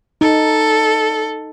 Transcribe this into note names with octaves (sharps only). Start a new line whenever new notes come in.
D#4 A4